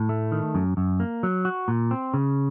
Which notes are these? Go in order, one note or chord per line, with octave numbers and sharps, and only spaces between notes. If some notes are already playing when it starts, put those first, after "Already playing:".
Already playing: A2
A3
D#3
F#2
F#2
A#3
F#3
F#4
A#2
C4
C#3